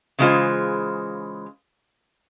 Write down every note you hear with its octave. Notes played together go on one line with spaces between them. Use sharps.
C#3 E3 G#3 D4 F4 C5